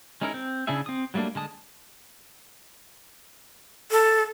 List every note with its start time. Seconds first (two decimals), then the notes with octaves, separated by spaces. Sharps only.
0.21 G#3 C#4 D#4 E4 A#4
0.34 C4
0.67 C#3 D4 E4 G#4 E5
0.86 C4 D#6
1.14 F#3 G3 A3 A#3 D4
1.35 D3 G#3 A5 D#6
3.91 A4